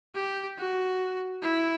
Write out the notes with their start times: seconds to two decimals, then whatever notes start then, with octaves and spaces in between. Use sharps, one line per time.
0.15 G4
0.59 F#4
1.43 E4